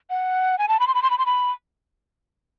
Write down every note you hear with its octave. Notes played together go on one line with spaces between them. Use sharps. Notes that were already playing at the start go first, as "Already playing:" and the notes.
F#5
G#5
A5
B5
C6
B5
C6
B5
C6
B5